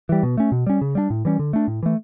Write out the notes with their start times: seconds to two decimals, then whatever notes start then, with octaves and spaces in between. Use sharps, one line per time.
0.09 E3 G3
0.23 B2
0.37 A3 C#4
0.52 B2
0.66 G3 C#4
0.81 C#3
0.95 G3 B3 D4
1.10 A2
1.25 E3 G3 C#4
1.39 D3
1.53 A3 D4
1.68 A2
1.83 E3 A3